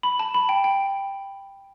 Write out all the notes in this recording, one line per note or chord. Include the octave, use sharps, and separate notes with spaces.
B5
A5
B5
G5
G5